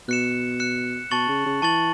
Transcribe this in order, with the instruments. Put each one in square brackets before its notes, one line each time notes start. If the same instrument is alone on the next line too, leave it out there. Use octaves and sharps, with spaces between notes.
[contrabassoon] B2 [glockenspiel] F#6 C#7 E7
[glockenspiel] F#6 C#7 E7
[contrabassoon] B2 [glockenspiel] A5 C#6 A6 F#7
[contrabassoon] C#3
C#3
[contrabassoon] E3 [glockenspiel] A5 C#6 A6 F#7